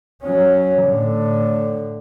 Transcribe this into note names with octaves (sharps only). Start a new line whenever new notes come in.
F#3 C#4
A2 D3